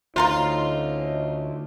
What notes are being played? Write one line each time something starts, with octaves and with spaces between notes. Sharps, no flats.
D2 C#4 D#4 F4 C5 A#5 C6